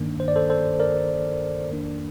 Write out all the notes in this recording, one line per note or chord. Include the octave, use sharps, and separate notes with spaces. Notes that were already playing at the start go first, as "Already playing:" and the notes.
Already playing: G2 D#3 A#3 D4
C5
D5
A4 C5
A4 C5
A#4 D5
F2 D#3 A#3 D4